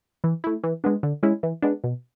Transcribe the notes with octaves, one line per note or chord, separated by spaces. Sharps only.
E3
A3 E4
E3
G#3 B3 D4
D3
G#3 C#4 E4
E3
G#3 B3 D4
B2